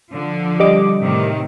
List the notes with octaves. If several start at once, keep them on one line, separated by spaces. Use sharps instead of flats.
D3 F3
G3 D#5 D6
A2 C3 D#3